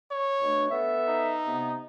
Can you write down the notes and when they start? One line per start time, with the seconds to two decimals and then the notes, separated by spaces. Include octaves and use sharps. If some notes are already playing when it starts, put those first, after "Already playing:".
0.11 C#5
0.41 B2 A3 D4
0.70 B3 A4 E5
1.08 D#4
1.47 C3 B3